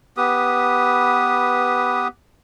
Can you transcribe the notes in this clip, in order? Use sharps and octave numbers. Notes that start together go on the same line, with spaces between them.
B3 G4 B4 D#6